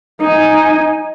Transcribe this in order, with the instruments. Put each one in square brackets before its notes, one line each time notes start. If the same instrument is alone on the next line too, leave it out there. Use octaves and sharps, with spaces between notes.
[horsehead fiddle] D#4 G#5